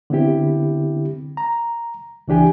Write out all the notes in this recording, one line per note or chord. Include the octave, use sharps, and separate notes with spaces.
D3 B3 C4 E4 G4
A#5
C#2 E3 D4 G4 G#5